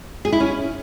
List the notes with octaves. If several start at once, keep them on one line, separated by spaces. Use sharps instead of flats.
G#4
E4
C#4